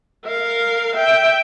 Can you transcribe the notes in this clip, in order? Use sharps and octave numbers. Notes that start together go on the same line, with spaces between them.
A#4 F5
E5 G5